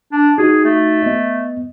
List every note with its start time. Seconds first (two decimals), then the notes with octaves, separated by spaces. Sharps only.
0.12 D4
0.38 D#4 F#4 G#4
0.65 A3
1.02 B3 D#5